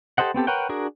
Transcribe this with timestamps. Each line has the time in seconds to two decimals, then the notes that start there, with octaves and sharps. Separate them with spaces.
0.18 G4 A4 C5 D#5 F#5
0.34 B3 C4 G4 A4
0.47 A#4 B4 C#5 F#5 G5
0.69 D4 F#4 G#4 A#4